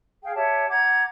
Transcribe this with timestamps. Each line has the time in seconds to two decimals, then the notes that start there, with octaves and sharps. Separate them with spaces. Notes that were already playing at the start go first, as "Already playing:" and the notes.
0.23 G#4 F5 G5
0.35 G4 C#5 E5 A5
0.69 F#5 A#5 D6 G#6